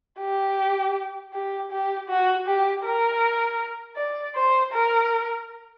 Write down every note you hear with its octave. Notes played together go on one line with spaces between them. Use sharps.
G4
G4
G4
F#4
G4
A#4
D5
C5
A#4